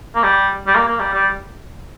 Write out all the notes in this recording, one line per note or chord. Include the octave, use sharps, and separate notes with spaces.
A#3
G3
G3
A#3
A#3
G3
G3